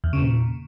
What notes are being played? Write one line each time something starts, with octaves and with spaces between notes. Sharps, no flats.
E2
C#3
A#2